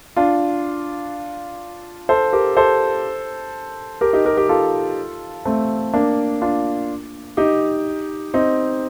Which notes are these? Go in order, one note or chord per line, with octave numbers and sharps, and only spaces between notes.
D4 F4
A4 C5
G4 A#4
A4 C5
G4 A#4
D#4 G4
G4 A#4
G4 A#4
F4 A4
A3 C4
A#3 D4
D4 F4
D#4 G4
C4 D#4